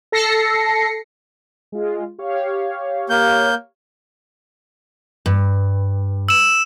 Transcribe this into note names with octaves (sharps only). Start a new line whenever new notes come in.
A4 A#6 C7 C#7
G#3 F4
G4 C#5 F5
A#3 G6
G2
E6 E7